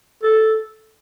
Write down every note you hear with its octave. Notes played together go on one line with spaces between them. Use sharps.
A4